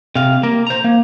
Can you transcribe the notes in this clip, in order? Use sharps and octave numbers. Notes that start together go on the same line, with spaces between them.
C3 F5
A#3 A#4
C5 A#5
A#3